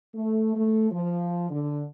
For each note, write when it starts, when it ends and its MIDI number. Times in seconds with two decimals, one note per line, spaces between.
0.14 0.53 57
0.55 0.91 57
0.91 1.48 53
1.50 1.83 50